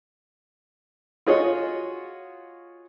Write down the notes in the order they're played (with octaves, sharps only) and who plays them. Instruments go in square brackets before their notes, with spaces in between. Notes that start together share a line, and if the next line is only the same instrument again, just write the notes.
[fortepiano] F4 F#4 G#4 C#5 D#5